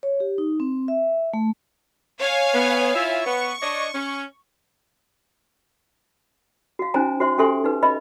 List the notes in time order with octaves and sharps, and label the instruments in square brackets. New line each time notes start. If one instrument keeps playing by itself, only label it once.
[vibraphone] C#5
G4
D#4
C4
E5
A3
[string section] C#5 F5 G#5
[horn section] B3
E4 F4 E5
[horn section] B3 [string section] C#6
[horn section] D4 C#5 D#5
C#4
[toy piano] F#4 F5
C#4 D#4 E4 C5 G#5 A#5
F#4 C5 E5 C6
C#4 G4 A4 E5 G#5 C6
D#4 B4
B4 D#5 E5 B5